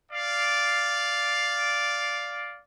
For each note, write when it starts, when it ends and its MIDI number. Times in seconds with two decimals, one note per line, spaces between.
0.12 2.60 74
0.12 2.60 77